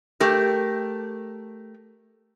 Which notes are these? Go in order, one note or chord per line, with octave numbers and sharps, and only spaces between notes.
A3 G4 A#4